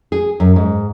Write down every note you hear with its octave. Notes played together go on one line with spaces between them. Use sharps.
G#4
F#2
G#2